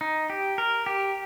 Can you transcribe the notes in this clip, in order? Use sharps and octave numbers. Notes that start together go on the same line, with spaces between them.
D#4
G4
A#4
G4